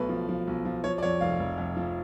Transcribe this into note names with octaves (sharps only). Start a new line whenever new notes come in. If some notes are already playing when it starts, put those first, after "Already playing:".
Already playing: B1 A3 B4
F3
F3
B1
F3
F3 C#5
D5
F2 C#5
F1 F5
F1
F2
F3